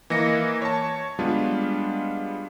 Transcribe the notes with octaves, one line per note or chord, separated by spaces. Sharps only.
E3 A#3 D#5 A#6 C#7
C#5 A5
G3 G#3 B3 D4 F4